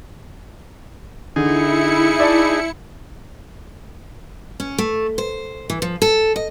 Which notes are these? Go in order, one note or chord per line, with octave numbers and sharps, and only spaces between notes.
D3 D#4 E4 G#4 C#7
D5 A5
C#4
A3
C5
E3
F3
A4
D#5